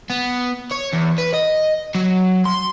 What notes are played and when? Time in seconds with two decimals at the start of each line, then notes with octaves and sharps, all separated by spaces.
0.10 B3
0.72 C#5
0.93 E2
1.18 B4
1.34 D#5
1.95 F#3
2.45 C6